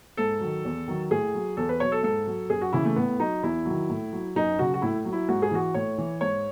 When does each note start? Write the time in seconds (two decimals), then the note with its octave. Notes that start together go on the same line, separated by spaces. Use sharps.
0.17 G#2 A4
0.41 D#3 F#3
0.65 E2
0.88 D#3 F#3
1.11 A2 G#4
1.34 F#3
1.57 E2 A4
1.69 B4
1.80 B2 F#3 C#5
1.92 A4
2.03 G#2 A4
2.27 F#3
2.50 F#2 G#4
2.61 F#4
2.73 C#3 E3 E4
2.85 A3
2.96 A2 B3
3.20 F#3 D#4
3.43 E2 E4
3.65 D#3 F#3
3.90 A2
4.12 F#3
4.36 F#2 D#4
4.59 C#3 F#3 F#4
4.74 F#4
4.82 A2 E4
5.05 F#3
5.13 E4
5.29 G#2 F#4
5.42 G#4
5.51 E3 F#4
5.74 A2 C#5
5.98 E3
6.21 G#2 C#5